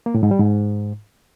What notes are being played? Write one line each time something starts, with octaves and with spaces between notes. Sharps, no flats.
A#3
A2
G#2
G3
G#2